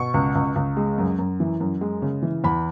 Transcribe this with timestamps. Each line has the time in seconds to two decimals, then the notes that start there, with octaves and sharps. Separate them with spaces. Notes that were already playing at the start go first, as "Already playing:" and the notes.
Already playing: B2 C#6
0.14 C#2
0.35 C#2
0.56 C#2
0.77 G#3
0.98 F#2
1.19 F#2
1.40 E3
1.60 F#2
1.81 G#3
2.02 C#3
2.22 E3
2.44 E2 B5